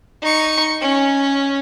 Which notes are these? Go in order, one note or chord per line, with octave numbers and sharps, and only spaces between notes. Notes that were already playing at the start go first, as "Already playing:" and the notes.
D#4 C#6
C#4